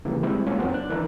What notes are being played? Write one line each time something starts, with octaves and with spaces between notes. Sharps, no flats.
C#3 E3 F#3 G3 A#3
G3 G#3 C4 E4
G#3 A#3 C#4 F4 F#4
F#2 F#3 B3 C4 F#4
D4 F#6
D#3 E3 D4 E4 A#4